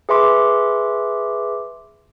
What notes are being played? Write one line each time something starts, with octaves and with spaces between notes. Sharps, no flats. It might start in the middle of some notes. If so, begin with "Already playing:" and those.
G#4 B4 E5 C6 D6